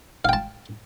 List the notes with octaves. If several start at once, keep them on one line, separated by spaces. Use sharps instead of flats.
F5 G5 A5